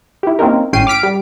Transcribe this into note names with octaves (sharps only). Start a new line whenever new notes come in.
E4 G4
A#3 C4 C#4 D#4 A#4
G#1 A2 C#4 G5 C7 D#7
D6 F6 B6 D7
G3